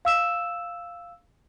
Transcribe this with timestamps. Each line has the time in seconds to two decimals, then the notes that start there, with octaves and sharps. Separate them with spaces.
0.05 F5 E6 E7